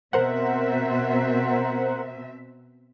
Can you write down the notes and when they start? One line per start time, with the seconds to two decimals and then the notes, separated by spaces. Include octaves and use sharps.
0.13 B2 C4 A#4 C5 E5 F#5